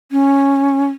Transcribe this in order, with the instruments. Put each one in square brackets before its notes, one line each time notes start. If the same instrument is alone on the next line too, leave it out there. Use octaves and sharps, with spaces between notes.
[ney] C#4